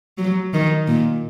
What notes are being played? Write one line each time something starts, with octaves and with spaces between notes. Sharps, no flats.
F#3
D#3
A#2